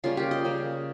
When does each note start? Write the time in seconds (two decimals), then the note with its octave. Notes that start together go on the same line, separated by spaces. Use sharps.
0.04 C#3 G3 A#3 C#4 F4
0.17 G4
0.31 D#5
0.45 C#3 G3 A#3 C#4